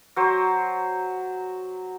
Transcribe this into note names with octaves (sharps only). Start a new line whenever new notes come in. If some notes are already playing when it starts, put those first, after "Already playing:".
F#3 C5